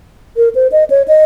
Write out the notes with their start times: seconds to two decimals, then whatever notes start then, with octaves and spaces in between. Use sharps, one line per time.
0.37 A#4
0.55 C5
0.72 D#5
0.90 C#5
1.08 D#5